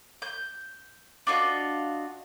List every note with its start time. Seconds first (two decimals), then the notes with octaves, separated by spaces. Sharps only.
0.22 G6
1.27 D4 F4 F#4 D#5